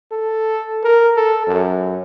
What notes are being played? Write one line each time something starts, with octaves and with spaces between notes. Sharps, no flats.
A4
A#4
A4
F#2